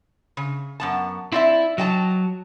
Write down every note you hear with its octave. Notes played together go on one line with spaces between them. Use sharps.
C#3
F#2 B3 A5
C4 E4 D5 E5
F#3 D#5 G5 A5